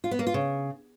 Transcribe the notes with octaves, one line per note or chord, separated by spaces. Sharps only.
F4
B3
A#3
F4
C#3